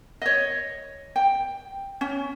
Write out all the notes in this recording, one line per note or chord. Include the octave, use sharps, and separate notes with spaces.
C#5 D#5
G5
C#4